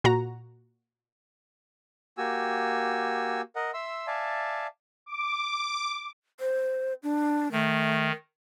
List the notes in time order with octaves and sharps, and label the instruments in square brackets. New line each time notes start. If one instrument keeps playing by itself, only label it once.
[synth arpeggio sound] A#2 F#4 A#5
[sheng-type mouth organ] A#3 F#4 G4 G#5 E6
A#4 D#5 F#5
E5 C6 E6
D5 E5 F5 G#5 A5
[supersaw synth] D6
[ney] C5
D4
[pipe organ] D#3 [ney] A3